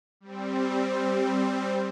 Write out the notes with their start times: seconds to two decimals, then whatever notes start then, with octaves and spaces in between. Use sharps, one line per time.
0.20 G3 C4